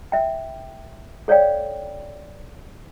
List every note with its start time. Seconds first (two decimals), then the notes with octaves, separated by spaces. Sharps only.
0.12 E5 G5
1.28 A4 C#5 D5 F5 G5